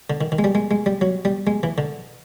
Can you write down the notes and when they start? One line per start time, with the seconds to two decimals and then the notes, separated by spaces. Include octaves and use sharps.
0.10 D3
0.21 D#3
0.32 D#3
0.39 G#3
0.44 G3
0.55 G#3
0.71 G#3
0.86 G3
1.01 F#3
1.25 G3
1.47 G#3
1.63 E3
1.78 D3